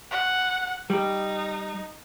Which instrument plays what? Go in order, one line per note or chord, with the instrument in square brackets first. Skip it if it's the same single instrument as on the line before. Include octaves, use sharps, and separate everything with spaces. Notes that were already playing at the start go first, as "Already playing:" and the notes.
[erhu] F#5
[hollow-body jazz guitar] G3 [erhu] D#4